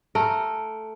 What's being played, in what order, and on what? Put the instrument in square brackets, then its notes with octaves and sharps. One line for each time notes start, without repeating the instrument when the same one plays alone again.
[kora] A3 A#4